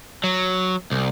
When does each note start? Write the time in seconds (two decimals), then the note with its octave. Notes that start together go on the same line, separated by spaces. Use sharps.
0.24 F#3
0.91 C2